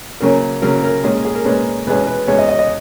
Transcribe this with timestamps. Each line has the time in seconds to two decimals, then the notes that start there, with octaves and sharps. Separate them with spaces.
0.21 C#3 F#3 A#3 C#4 A#4
0.62 C#3 F#3 A#3 C#4 A#4
0.84 A#4
1.04 A#2 G#3 C#4 G#4
1.25 G#4
1.35 A#4
1.45 A#2 G#3 C#4 B4
1.87 E2 B2 G#3 C#4 B4
2.07 B4
2.27 E2 B2 G#3 C#4 C#5
2.39 D#5
2.49 D#5
2.59 D#5